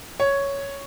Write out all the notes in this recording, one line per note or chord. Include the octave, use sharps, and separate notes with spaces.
C#5